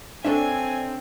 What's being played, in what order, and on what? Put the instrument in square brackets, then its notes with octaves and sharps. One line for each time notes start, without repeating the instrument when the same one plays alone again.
[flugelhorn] C4 [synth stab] D4 [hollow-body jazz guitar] A4 C#5 E5 [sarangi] G#5